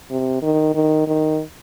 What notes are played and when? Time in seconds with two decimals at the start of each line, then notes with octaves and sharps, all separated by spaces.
0.11 C3
0.42 D#3
0.75 D#3
1.07 D#3